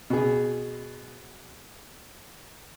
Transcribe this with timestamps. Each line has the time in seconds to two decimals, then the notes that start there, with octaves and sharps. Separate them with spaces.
0.10 B2 G#4